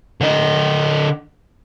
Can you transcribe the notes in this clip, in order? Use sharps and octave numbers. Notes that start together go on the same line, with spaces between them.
D3 D#5